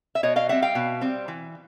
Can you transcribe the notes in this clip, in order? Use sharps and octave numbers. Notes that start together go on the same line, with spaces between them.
E5
B2 C#5 D#5
D#5 F5
G3 C4 E5 F#5
F5 G5
B2
G3 C4
E3